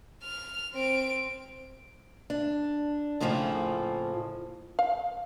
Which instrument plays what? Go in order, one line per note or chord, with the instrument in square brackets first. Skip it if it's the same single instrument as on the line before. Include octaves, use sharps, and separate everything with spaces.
[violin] F6
C4 D7
[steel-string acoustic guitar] D4
F2 A2 C#3 F3 A3 A#3
[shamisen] F5